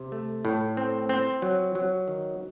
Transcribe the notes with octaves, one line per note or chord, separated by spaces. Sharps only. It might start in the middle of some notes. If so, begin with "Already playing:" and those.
Already playing: C3
A3
A2
C4
C4
F#3
F#3
D#3